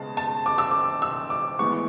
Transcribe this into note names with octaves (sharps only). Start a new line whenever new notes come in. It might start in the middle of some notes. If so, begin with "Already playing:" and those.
Already playing: C#3 G#3 B3 A5
A5
D6
E6
D6
E6
D6
A2 E3 G#3 B3 C#6